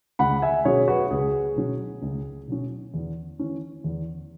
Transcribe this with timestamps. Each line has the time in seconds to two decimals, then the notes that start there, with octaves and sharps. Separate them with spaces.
0.19 C#2 F#5 B5
0.42 E5 G#5
0.65 B2 F#3 C#4 G#4 C#5
0.88 F#4 B4
1.11 C#2 G#4
1.56 B2 F#3 C#4
2.02 C#2
2.48 B2 F#3 C#4
2.94 E2
3.39 E3 C#4
3.84 E2